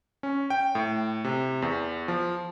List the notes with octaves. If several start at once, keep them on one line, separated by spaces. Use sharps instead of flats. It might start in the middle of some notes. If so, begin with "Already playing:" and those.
C#4
G5
A2
C3
E2
F3